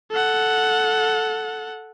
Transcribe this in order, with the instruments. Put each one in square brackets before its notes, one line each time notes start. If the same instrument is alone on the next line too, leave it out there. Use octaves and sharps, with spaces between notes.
[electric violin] A4 F#5